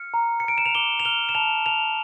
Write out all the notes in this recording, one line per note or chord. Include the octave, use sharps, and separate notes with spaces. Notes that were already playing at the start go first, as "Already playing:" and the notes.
Already playing: F6 C#7
A#5
C#7
A#5 D7
E7
F7
D6 G7
F7
F6 G7
E7
A5 F7
A5 F7